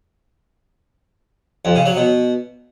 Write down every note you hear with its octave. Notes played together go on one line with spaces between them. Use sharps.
F2
C#3
F#3
B2